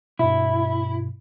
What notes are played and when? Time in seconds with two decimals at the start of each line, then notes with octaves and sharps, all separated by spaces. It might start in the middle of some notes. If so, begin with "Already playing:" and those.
0.19 G2 B2 E4